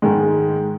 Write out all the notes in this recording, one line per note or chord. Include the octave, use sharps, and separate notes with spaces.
G#2 D#3 G#3